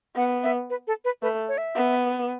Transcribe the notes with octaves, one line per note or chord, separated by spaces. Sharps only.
B3 F#5
E5
B4
A4
B4
A3 B4
C#5
E5
B3